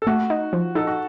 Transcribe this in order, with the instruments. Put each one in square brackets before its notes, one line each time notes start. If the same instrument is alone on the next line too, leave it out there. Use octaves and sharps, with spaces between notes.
[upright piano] A4
[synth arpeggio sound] A3 [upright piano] F#4
[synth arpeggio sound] D#4
F3
[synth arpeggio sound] D#4 [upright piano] A4
[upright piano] F#4